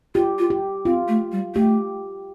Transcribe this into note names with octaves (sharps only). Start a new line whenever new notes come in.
F4 G4
F4
G4
C4 F4
A3
G3
A3 G4